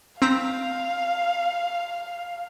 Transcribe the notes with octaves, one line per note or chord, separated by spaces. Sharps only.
C4 F5 A#5 B6